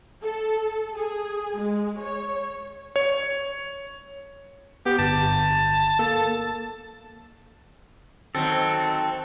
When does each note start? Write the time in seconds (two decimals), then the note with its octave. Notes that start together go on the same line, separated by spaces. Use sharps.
0.24 A4
0.95 G#4
1.58 G#3
2.01 C#5
2.96 C#5
4.86 B3 G4
4.99 G1 A5
5.99 A#3 A4
8.35 D#3 F#3 C4 A4